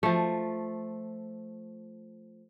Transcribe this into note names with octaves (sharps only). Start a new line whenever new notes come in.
F3 A3